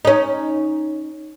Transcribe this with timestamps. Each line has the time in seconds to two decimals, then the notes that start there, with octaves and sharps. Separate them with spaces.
0.05 C#4 D#4